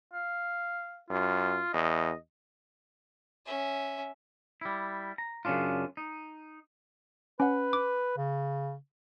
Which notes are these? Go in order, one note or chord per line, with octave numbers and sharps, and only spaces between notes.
F5
F#2 F4
E2 D#5
C#4 E5
G3 E4
A#5
F#2 C#3 A#3 C#4 D4 F4
D#4
C#4 B4 F#5
D6
C#3